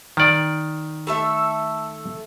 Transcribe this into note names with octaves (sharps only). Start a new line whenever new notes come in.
D#3 D5
A3 A4 E5